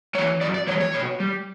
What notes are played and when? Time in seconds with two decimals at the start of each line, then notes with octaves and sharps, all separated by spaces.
0.15 G3 C#5
0.18 E3
0.41 F#2 D5
0.54 D5
0.67 E3 G3 C#5
0.80 C#5
0.94 B2
1.20 G3